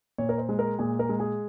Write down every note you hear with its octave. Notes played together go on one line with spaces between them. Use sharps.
A#2 C#5
A#4
C5
G#3
A#4
A#2 G#4
A#4
G#3
G#4